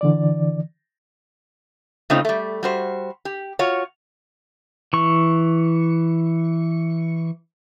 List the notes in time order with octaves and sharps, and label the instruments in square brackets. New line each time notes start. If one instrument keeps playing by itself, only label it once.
[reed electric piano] D3 E3 D5
[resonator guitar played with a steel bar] C#3 A3 C4 D#4 F4
G3 A3
G3 F#4 C5
G4
F4 F#4 C#5
[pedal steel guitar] E3 C#6